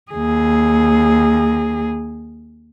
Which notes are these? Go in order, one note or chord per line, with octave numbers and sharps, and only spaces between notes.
D#2 G#4